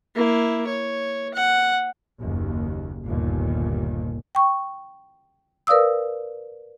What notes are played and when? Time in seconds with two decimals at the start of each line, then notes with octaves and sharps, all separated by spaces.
0.15 A#3 E4
0.67 C#5
1.34 F#5
2.18 F#1 D#2
3.04 G1 D#2 A#2
4.35 G5 C#6
5.67 A#4 B4 D5 F5 D#6 E6